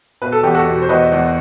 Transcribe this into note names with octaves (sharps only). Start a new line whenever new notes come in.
B2 B4
A4
E2 G4
F#4 A4
B2
C5
E2 B4 D#5
E2